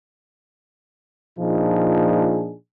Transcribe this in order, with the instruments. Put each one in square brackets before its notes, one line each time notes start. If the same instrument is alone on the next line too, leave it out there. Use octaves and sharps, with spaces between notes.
[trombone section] A#2 F3 D4 D#4 G#4